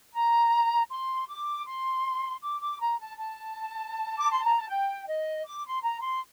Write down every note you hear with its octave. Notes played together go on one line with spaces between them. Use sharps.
A#5
C6
D6
C6
D6
D6
A#5
A5
A5
D6
C6
A#5
A5
G5
D#5
D6
C6
A#5
C6